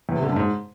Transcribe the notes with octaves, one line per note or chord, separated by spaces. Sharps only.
E2
C3
D3
F#2
G#2